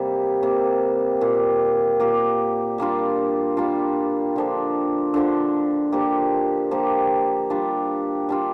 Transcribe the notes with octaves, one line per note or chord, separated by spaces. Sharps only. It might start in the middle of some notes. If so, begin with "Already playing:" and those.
Already playing: C3 G3 A#3
C3 G3 A#3
A#2 A#3 G4
A#2 A#3 G4
G3 A#3 D4 F4
G3 A#3 D4 F4
D3 F3 D4
D3 F3 D4
F3 A#3 G4
F3 A#3 G4
G3 D4 F4
G3 D4 F4